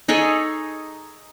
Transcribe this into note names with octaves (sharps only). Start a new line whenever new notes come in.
D#4 G#4 A4 C#5